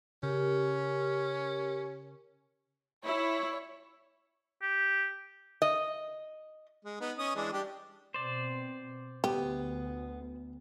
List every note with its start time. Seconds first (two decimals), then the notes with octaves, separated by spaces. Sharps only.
0.23 C#3 C#4 G4 A#4
3.05 E4 C#5
4.62 G4
5.62 D#5
6.85 G#3
7.01 B3 D#4
7.18 C#4 D#5 D#6
7.36 E3 G#3 D4
7.53 G3 D4 G4
8.14 B2 C4 C5 D5
9.24 D2 B3 G4